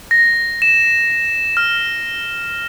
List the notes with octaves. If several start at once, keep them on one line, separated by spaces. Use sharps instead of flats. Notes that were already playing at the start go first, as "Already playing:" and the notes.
A#6
E7
F6